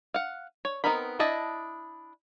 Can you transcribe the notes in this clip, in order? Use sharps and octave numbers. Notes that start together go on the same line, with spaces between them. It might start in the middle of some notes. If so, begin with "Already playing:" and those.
F5 F#5
C#5
B3 C4 D#4 A#4 B5
D4 E4 D#5 A5